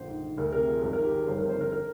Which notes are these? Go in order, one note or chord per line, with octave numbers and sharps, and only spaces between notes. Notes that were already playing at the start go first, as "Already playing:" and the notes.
Already playing: A#1 D3 C5
G#2
D#3
D2 A#4
C3 A#4
F3 G#4
G#1 A#4
G#2 A#4
G4
D#3 G#4
G1 C5
F2 A#4
C5
D3 A#4
A#4